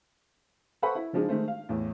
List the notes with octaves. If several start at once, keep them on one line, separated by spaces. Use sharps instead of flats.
A4 B4 C5 F#5 B5 C#6
E4
C#3 F3 G#3 D4 D#4 G#4
D#3 G#3 A3 C5
F5
E2 A2